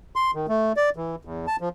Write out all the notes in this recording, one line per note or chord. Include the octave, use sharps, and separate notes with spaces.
C6
D#3
A3
D5
E3
E2
A5
F3